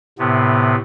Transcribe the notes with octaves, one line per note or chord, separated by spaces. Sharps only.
A2 C3 B3